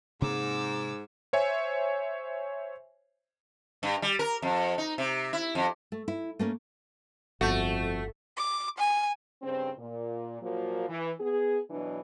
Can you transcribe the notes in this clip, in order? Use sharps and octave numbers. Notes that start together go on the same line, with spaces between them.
G#2 C3 A#3 C4 D6 E6
C5 C#5 E5 G#5
G2
G3
A#4
F2
D#4
C3
E4
F2
A3
E4
A3 A#3 C#4
G1 F2 A3 F#4
D6
G#5
G2 C#3 C4
A#2
A#2 F3 F#3 A#3 F#4
E3
B3 G#4
B2 E3 F#3 D4